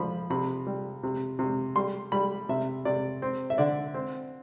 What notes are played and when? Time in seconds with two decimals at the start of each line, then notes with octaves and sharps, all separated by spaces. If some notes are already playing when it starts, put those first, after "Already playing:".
Already playing: F3 B5
0.30 C3 B5
0.67 G3
1.03 C3
1.39 C3
1.76 G3 C6
2.12 G3 B5
2.49 C3 E5
2.85 C3 D5
3.22 C4
3.50 E5
3.58 D3 D5
3.94 C4